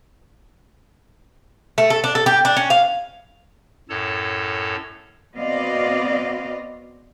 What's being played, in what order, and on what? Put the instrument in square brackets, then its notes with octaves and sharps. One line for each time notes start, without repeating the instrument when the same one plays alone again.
[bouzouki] A3
A4
D4
A4
G4
D4
C#4
F5
[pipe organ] F#2 A2 A4 C#5 A5
[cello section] B3 C4 F#4 D5 D#5 F5